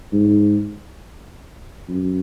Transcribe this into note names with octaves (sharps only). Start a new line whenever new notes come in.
G#2
F#2